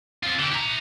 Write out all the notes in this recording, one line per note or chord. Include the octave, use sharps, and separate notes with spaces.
C4 F4
D3 G4
E4 A#5